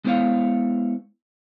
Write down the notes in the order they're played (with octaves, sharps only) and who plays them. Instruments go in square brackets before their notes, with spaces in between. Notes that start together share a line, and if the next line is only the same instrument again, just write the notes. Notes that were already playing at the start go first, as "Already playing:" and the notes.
[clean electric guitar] G#3 B3 E4 C5 C#5 F5